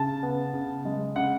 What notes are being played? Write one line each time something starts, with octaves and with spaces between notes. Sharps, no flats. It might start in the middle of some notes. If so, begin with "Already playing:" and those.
Already playing: C#3 A5
B3
C#3
G#3
C#3 F#5